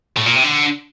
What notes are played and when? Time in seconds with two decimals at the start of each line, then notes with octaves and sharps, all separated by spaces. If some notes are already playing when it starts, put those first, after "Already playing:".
0.17 A2
0.26 A#2
0.35 C3
0.44 D3